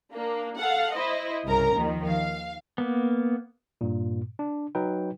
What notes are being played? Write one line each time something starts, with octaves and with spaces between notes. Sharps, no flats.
A#3 D4
A4 F5 F#5
E4 C5 D#5
C2 G2 C#3 A#4 A#5
D#2 D#3 F3
F5
A#3 B3
G2 A#2
D4
F#3 D#4 B4 G5